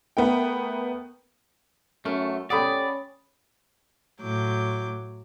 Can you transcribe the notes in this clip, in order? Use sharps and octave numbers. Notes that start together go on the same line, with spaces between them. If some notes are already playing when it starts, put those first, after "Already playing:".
A3 B3 A#4 G5
F#2 A3 C#4 A#4
C#4 G4 A4 D5 F#5 B5 D#6
A2 F#3 D6 G6